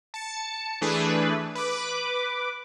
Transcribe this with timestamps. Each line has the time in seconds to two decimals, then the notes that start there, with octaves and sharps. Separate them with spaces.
0.14 A5 C#7
0.81 E3 A3 D4 G#4 B4
1.55 B4 D6